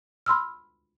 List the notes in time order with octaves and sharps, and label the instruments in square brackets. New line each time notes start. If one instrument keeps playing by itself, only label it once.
[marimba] B5 C6 E6 F6